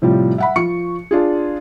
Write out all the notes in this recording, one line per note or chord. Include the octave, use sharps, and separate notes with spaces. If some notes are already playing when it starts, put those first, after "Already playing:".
A2 C3 F3 G3
E5 F#5 B5
F3 C#6 C#7
D4 F4 G#4